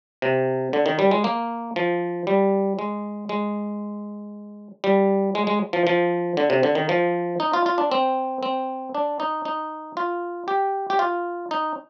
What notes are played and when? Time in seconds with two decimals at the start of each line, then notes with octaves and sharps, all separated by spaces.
0.22 C3
0.73 D3
0.86 D#3
0.99 G3
1.11 G#3
1.24 A#3
1.76 F3
2.27 G3
2.79 G#3
3.29 G#3
4.84 G3
5.35 G#3
5.47 G#3
5.73 F3
5.87 F3
6.37 D3
6.50 C3
6.63 D3
6.75 D#3
6.89 F3
7.40 D#4
7.53 F4
7.66 F4
7.78 D4
7.92 C4
8.43 C4
8.95 D4
9.20 D#4
9.45 D#4
9.97 F4
10.48 G4
10.90 G4
10.99 F4
11.51 D#4